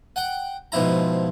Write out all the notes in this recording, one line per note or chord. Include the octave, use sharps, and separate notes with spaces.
F#5 G5
G#2 B2 F3 E4 A#5